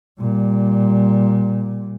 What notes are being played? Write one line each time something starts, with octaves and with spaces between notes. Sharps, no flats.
A#2 G3